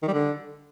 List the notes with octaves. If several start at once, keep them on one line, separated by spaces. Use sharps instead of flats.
D#3
G3
D3